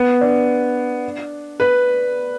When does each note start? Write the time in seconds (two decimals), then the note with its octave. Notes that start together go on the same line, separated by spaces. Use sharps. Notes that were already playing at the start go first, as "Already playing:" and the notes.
Already playing: B3
0.21 D4
1.60 B4